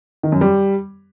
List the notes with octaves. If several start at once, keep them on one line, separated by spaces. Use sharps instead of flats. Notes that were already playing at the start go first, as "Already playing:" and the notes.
D#3
F#2
G3